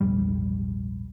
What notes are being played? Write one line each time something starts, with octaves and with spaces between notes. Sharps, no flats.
A#1 E2 G#2 G3